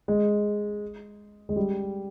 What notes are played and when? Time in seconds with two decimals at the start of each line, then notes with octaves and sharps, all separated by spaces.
0.08 G#3
1.49 G#3
1.56 G3